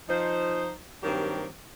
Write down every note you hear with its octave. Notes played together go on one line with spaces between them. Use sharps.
F3 D#4 C5
G2 D#3 F#3 A#3 C4 G4